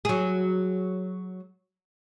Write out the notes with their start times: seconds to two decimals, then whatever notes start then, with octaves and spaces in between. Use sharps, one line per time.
0.05 F#3 G#4